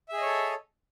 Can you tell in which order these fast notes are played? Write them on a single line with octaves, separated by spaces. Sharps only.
E5 G#4 D#5 C#5 A4